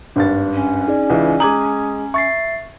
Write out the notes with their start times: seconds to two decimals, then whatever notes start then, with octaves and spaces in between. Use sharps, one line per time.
0.16 G#1 G2 D4 A6
0.53 C#4
0.87 D#4 G#4 D5
1.10 C#2 E3
1.40 G#3 A#5 D6 D#6 G#6 F#7
2.14 E5 C#6 A6 C7